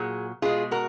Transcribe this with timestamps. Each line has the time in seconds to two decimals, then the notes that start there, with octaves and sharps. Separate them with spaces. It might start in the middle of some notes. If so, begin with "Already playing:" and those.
Already playing: A#2 F#3 G#4
0.42 B2 G#3 F4 G#4
0.71 F#4 A#4